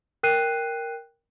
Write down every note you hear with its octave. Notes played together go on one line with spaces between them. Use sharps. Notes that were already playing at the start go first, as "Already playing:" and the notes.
A#4 G5 F#6 C7 D#7